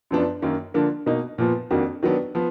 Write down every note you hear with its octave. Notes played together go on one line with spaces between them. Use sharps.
F#2 F3 B3 D4
F#2 D#3 A#3
D3 F3 A#3 D4
B2 A#3 D#4
A#2 F3 B3
F2 D#3 A#3 D4 F#4
D#3 F#3 B3 D4
F3 B3